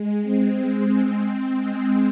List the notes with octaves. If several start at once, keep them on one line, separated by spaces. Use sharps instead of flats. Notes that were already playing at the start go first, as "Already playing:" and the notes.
Already playing: G#3
C4
C4
G#3